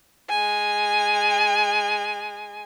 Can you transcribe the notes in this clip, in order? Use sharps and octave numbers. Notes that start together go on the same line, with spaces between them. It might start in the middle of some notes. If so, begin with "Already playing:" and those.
G#3 G#5